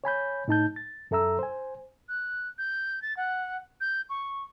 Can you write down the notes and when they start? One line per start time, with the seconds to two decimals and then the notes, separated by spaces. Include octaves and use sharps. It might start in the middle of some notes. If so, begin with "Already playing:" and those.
0.04 C#5 G#5 B5 G6
0.48 A2 D#4 A5 G6
0.76 A6
1.11 F#2 A4 E5 A#5 E6
1.39 C5 G#5
2.09 F#6
2.58 G6
3.02 A6
3.17 F#5
3.81 G6
4.09 C#6